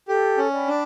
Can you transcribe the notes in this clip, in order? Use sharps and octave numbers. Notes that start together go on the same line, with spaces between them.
G4 A4
C#4
D5 G5 B5
D4